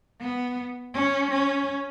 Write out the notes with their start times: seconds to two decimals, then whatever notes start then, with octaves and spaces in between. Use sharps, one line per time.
0.21 B3
0.94 C#4
1.30 C#4